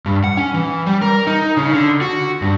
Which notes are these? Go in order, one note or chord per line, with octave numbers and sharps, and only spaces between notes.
G2
F#5
C#4
E3
G3
A#4
D#4
C#3
D3
F#4
G2